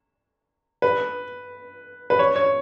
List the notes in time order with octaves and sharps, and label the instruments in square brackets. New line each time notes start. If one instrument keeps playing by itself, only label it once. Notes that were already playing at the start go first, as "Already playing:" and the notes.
[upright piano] B4
B4
C#5
C#5